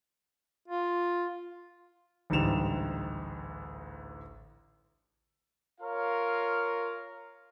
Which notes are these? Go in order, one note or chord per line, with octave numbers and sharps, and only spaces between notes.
F4
A1 D2 G#2 G3 E7 F7
F4 A#4 C#5 F5